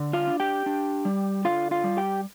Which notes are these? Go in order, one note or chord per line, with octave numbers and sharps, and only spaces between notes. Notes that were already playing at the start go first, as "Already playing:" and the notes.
Already playing: D3
F4 F5
D4
G4 G5
D4
G3
D3 F4 F5
F4 F5
G3
G4 G5